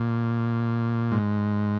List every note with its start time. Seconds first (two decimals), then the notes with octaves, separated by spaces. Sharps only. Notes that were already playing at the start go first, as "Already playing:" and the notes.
Already playing: A#2
1.12 G#2